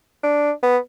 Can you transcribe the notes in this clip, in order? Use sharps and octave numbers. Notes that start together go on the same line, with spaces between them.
D4
B3